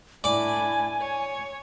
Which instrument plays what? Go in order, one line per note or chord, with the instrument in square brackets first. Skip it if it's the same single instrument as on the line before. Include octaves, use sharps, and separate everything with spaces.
[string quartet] A2 D4 E4 [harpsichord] D5 D6 [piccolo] G#5
[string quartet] C#5